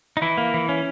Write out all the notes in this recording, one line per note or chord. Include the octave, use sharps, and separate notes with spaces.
D#4
E3 E4
A#3
E3
C#4